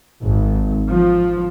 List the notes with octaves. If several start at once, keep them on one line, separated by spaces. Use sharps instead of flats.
G#1
F3